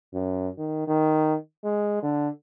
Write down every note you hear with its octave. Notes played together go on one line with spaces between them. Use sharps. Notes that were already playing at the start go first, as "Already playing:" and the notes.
F#2
D#3
D#3
G#3
D3